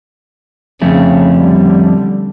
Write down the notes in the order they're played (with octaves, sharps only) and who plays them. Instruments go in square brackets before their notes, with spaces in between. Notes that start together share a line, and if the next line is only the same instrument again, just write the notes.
[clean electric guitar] F2 A3 C#4 [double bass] C#3
[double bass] D3 G3